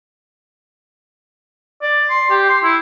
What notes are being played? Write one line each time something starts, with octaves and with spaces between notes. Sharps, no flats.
D5
C6
G4
C6
E4